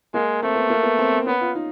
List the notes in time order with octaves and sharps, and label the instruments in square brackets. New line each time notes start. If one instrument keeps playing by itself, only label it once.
[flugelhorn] G#3 [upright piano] A#3
[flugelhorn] A3 [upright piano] C4
[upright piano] B3
A#3
B3
C4
[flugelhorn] B3 [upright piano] C#4
[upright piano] F4
D#4